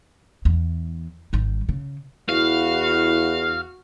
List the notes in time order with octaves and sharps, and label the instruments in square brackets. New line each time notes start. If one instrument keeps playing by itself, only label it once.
[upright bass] E2
G#1 G3
C#3
[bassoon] E2 [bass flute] E4 [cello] F#4 [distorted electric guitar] F5